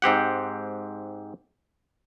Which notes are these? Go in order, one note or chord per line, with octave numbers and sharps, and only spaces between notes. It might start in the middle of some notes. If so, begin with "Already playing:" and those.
G#2 C4 G4 F#5